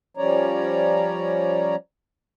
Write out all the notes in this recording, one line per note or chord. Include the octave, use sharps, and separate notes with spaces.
F3 G3 C#4 C#5 D5 A#5